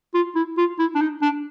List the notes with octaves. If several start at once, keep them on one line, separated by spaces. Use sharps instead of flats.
F4
E4
F4
E4
D4
D#4
D4